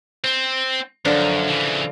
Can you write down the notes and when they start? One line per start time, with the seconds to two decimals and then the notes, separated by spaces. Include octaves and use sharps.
0.24 C4
1.05 F#2 D3 F3 D4
1.48 C#3 E3